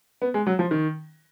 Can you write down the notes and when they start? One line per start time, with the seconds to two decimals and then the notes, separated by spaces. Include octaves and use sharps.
0.22 B3
0.34 G#3
0.47 F#3
0.59 F3
0.71 D#3